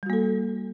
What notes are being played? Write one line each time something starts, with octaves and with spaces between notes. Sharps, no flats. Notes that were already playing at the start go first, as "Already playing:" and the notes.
G3 A#3 F#4 A4